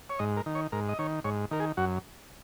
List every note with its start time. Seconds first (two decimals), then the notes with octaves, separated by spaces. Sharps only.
0.10 C#5
0.19 G#2 D#5
0.37 A#4
0.46 D#3
0.55 C#5
0.72 G#2 A#4
0.89 D#5
0.99 D#3 C#5
1.24 G#2 C#5
1.51 D#3 A#4
1.60 G#4
1.77 F#2 F#4